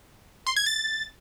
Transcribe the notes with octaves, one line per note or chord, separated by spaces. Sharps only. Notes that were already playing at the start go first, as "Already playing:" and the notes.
C6
G#6
A6